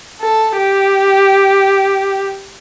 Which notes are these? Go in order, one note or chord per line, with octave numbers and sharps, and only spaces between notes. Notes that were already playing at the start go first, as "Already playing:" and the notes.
A4
G4